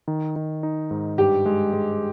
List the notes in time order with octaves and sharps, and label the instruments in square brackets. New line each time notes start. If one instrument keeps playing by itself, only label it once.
[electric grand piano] D#3
D#3
D#4
G#2
[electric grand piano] G2 [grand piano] G4
[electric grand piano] G#3
G#3